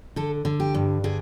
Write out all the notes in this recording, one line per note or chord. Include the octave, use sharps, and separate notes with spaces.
D3 A4
D3
G4
G2
D3 G#4